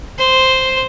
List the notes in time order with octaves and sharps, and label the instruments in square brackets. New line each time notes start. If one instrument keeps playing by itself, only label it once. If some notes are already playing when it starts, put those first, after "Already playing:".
[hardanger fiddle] C5